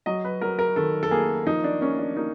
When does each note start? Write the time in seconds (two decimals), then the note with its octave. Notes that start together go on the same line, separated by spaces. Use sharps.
0.06 F#3 D#5
0.24 B4
0.41 F#3 A#4
0.59 A#4
0.76 D#3 A4
1.03 A4
1.11 A#3 G#4
1.46 F3 D#4
1.64 D4
1.81 A#3 C#4
1.99 D4
2.17 A#3 D#4